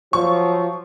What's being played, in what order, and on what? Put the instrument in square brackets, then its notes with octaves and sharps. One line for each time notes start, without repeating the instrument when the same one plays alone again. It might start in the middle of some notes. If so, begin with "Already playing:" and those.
[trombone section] F3 F#3 [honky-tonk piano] C#6